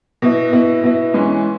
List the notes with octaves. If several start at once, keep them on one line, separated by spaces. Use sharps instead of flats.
B2 B3 E4
B2 B3 E4
B2 B3 E4
G#2 E3 C#4 E4